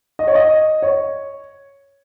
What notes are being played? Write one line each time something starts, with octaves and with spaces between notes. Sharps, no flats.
D#5
C#5
D#5
C#5